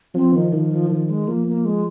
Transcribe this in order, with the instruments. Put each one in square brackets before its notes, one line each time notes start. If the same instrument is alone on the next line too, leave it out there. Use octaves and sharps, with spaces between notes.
[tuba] F3 [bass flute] C4
[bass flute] D#3
[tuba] D#3 [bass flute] F3
[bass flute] F3
[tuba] D#3 [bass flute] F3
[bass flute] G#3
[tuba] F3 [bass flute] A#3
[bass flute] A#3
G#3